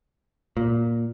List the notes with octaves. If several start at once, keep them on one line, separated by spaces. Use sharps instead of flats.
A#2